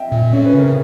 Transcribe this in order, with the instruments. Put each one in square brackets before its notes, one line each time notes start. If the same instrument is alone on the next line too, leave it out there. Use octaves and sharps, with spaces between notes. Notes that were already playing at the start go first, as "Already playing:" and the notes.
Already playing: [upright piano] D#5 E5 G5
[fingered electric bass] A#2
[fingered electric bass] C#4 [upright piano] C#5
[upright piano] B4
[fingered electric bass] C#3 [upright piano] A#4